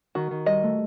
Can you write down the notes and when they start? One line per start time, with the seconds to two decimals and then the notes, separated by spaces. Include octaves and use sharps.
0.15 D#3 F#4
0.31 D#3
0.46 G3 D#5
0.63 A3